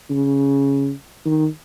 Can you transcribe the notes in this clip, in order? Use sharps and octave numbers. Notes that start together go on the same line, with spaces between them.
C#3
D#3